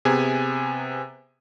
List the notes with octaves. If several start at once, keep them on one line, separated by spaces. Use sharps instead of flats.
C3 B3 G#4 G#5